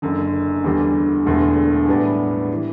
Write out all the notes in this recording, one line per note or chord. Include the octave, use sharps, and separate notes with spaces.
F#1 F#2 D3
E2 D3 G3
E1 E2 D3 A3
A2 G3 B3 D4
E3